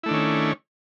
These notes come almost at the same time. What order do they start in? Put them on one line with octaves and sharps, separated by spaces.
E4 A3 D4 D#3 C#4